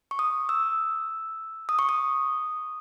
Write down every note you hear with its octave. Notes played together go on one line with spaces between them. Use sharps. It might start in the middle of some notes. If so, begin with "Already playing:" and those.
C#6
D#6
E6
D#6
C#6
D#6